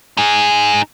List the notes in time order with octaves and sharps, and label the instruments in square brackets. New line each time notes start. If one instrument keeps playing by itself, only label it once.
[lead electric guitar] D#4 G#4